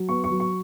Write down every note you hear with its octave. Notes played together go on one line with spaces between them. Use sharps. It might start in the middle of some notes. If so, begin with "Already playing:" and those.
Already playing: F#3
B3 C#6
C#6
F#3
C#6